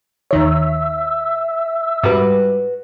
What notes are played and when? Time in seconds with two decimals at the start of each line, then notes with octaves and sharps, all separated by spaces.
0.31 D#2 D#3 C#5 E5
2.03 G#2 G3 F#4 B4